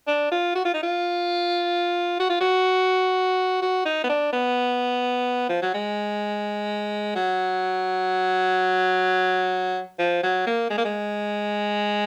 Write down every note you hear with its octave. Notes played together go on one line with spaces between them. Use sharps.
D4
F4
F#4
F4
D#4
F4
F#4
F4
F#4
F#4
D#4
B3
D4
B3
F3
F#3
G#3
F#3
F3
F#3
A#3
G#3
A#3
G#3